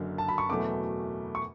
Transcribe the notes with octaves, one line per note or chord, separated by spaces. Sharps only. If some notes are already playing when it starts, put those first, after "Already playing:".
Already playing: F#1 F#2 D3
A5
B5
C#6
F#1 E2 B2 F#3 A3 D6
C#6